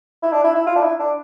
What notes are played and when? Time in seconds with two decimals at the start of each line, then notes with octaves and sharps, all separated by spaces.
0.23 E4
0.32 D4
0.44 E4
0.55 E4
0.67 F4
0.76 D4
0.83 E4
0.99 D4